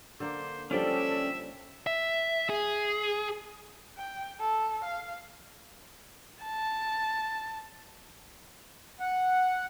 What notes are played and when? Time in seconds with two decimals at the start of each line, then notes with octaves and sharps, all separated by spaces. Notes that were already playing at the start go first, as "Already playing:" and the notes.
0.20 D3 A#3 C5
0.71 D3 F3 G3 C#4 A4 D5 E5 G5
1.87 E5
2.50 G#4
3.97 G5
4.39 A4
4.84 F5
6.43 A5
9.00 F#5